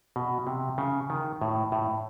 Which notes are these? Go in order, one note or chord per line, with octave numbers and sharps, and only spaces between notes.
B2
C3
C#3
D#3
A2
A2